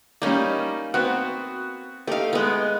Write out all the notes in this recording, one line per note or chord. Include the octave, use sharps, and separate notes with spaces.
G3 A#3 C#4 D#4 D5
B3 C4 F#4 F#5
A3 D#4 G4 F5
G#3 B3